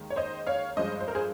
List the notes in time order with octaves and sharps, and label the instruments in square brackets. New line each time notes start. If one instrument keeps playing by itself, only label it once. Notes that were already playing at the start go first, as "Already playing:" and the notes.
Already playing: [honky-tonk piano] D#2 D#3 G#3
C#5
C5 D#5
C#5 F5
G2 F3 G#3 C5 D#5
C5
A#4
G#4 C5